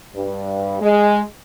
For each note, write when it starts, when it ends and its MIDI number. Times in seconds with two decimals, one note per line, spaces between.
0.15 0.80 43
0.80 1.20 56